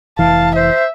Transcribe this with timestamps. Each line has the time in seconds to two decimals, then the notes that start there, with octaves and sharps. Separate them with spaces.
0.19 F1 E3 F5 A5
0.55 C5 E5